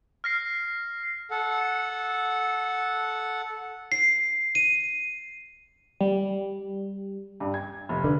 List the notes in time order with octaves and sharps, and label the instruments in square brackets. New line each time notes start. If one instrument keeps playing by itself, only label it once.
[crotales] F6 A#6 C7
[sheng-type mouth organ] A4 F#5
[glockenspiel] C7
D#7
[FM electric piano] G3
[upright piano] G2
G#6
F1
[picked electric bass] D3 [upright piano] B4